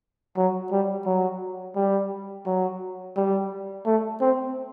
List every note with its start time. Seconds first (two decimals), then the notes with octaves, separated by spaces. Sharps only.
0.37 F#3
0.72 G3
1.06 F#3
1.76 G3
2.46 F#3
3.17 G3
3.86 A3
4.21 C4